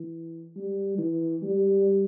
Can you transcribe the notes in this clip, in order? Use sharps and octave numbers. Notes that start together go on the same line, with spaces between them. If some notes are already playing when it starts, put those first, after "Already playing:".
Already playing: E3
G3
E3
G3